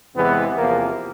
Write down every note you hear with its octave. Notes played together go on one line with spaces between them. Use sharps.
E2 C3 E3 G#3 B3
E2 C3 F3 A#3